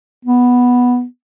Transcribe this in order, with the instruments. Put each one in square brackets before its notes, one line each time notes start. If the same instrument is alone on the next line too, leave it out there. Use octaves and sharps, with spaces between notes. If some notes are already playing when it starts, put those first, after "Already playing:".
[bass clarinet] B3